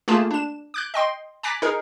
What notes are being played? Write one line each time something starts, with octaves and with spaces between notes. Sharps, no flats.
A3 A#3 F4 G#4 A5 E7
D4 E7
D6 F#6 G6
D#5 G5 C6
G#5 A#5 D6 F#6 A6 B6
D#4 G#4 A#4